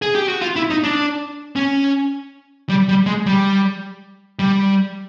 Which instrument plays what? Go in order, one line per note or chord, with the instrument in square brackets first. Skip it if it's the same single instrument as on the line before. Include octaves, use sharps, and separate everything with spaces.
[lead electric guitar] G#4
G4
F#4
F4
E4
D#4
D4
C#4
G3
G3
G#3
G3
G3